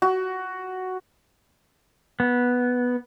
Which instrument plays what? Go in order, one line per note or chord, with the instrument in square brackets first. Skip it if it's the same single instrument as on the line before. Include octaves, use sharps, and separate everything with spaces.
[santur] F#4
[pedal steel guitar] B3